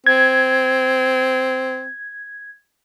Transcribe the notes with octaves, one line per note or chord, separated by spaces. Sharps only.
C4 G#6